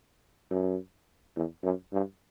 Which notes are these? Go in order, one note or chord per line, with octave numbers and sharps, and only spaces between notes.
F#2
E2
F#2
G2